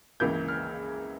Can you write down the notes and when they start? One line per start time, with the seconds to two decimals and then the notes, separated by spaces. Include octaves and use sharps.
0.20 C#2 C#3 E3 A#3 G6
0.48 F6